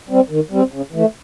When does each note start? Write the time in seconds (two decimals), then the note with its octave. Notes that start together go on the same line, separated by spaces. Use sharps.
0.09 G3 C4
0.30 D#3
0.51 G3 C4
0.72 C#3
0.92 E3 A3